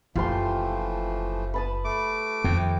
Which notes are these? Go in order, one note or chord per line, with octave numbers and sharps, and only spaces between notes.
F#1 E3 F3 A3 F4 G4 C6
B4 A5 D#6
A3 D6
F2 D#3 G5